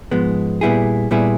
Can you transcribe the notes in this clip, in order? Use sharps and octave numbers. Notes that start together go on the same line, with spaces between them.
G#2 F3 G#3 B3
A#2 G3 B3 E4 G#4
A#2 G3 B3 E4 G#4